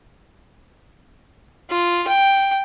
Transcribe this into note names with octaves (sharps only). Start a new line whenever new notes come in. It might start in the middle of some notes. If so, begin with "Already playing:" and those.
F4
G5